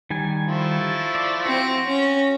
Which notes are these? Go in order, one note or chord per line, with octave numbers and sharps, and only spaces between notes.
D#3 G3 G#5
F3 A3 E4
D5
C4 F#4
C#4